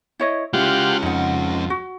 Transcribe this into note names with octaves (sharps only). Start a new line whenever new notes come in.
E4 C#5 D#5
G#3 C#4 E4 F4 G4 F#5
F2 D#4 F#5
F#4